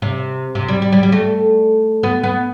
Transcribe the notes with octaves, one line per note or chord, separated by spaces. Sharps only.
C3
C3
G3
G3
G3
G3
A3
B3
B3